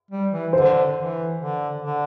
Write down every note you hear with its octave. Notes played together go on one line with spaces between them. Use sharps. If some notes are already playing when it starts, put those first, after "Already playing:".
G3
E3
D3 C5
E3
D3
D3